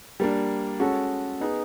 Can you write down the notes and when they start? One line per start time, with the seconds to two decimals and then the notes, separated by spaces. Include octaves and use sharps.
0.20 G3 A#3 D4
0.80 G#3 C#4 F#4 A4
1.40 B3 D#4 G#4 B4